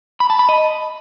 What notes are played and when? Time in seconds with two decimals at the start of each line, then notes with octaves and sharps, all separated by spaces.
0.20 B5
0.30 A5
0.39 B5
0.49 D#5